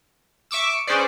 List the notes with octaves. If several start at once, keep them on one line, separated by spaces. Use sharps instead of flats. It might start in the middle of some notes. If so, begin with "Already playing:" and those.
E5 C#6 D6 E6
C#4 G#4 B4 C5 D5